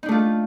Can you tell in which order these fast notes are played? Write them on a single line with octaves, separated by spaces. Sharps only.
D#4 D4 A3 F4